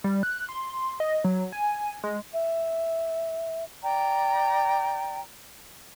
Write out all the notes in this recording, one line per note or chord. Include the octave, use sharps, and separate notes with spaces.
G3
F#6
C6
D#5
F#3
G#5
G#3
E5
D5 G5 A#5